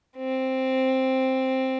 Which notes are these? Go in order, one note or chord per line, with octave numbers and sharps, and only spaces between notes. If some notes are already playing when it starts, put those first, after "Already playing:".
C4